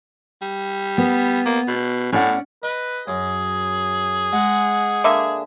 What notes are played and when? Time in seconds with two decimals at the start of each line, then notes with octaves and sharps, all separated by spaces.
0.42 G3
0.98 B3
1.46 A#3
1.68 B2
2.12 A2 C#4 D5 F#5
2.63 B4 D#5
3.07 F#2 G#4
4.33 G#3 F#5
5.04 D3 A#3 E5